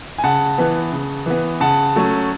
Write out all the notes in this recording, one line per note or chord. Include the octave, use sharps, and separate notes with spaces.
G#5
C#3 F#5 A5
E3 B3
C#3
E3 B3
C#3 F#5 A5
F#3 A3 C#4